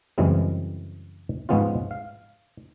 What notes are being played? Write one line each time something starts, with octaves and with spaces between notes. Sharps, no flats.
F#2 C#3 E3 G3 G#3 C4
G#2 F3 G#3 B3 C#4 F4
F5